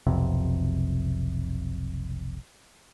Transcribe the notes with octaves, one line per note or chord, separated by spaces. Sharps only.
F1 B1 F2 C3